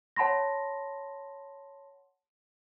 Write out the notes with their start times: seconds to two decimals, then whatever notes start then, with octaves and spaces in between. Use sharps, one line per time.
0.16 C#5 F#5 A5 B5 C6 A#6